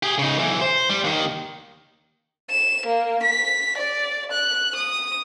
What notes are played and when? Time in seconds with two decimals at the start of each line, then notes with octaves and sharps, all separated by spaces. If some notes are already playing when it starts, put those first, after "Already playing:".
0.03 G4 G#4
0.19 C#3 D#4
0.39 B1 E3
0.61 C5
0.90 G3
1.04 D#2 D#3
2.50 E7
2.86 A#3
3.23 B6
3.78 D5
4.32 F#6
4.75 D#6